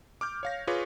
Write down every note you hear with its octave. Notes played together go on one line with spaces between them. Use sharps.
D6 F6 G6
C#5 F5 A#6
F4 G#4 B4 C#5 C#6 D6